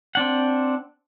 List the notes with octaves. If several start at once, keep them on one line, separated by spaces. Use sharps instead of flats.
C4 D4 F#5